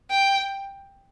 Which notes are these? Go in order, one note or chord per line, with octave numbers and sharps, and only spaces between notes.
G5